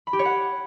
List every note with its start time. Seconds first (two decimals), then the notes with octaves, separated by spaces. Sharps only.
0.07 B5
0.13 G4
0.19 C#5
0.25 F#5